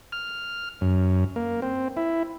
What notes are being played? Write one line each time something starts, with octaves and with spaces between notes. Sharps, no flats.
F6
F#2
A#3
C4
E4